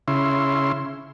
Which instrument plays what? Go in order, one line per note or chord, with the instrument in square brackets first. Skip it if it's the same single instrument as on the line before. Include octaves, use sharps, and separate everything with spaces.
[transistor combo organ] C#3 E4 C6